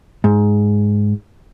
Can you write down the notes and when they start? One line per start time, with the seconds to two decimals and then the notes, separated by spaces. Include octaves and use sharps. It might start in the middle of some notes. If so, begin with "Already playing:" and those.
0.24 G#2